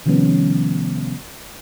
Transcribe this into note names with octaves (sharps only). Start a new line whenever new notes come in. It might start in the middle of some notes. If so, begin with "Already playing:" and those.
C3 D#3 F3 G3 B3 C#4